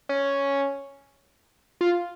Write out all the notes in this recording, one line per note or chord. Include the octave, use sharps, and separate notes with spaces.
C#4
F4